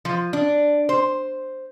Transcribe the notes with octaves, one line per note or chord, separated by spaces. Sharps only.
F3
D4
C5